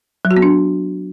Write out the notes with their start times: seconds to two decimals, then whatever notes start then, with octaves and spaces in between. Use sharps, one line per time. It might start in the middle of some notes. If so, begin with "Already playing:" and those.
0.25 F#3
0.31 F#4
0.37 B3
0.42 D4